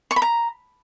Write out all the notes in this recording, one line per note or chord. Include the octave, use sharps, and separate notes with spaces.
C#6
B5
A#5